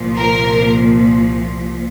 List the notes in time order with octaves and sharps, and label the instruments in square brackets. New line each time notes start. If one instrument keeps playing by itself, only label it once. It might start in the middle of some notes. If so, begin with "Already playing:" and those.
Already playing: [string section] C2 A#2 F3
A#4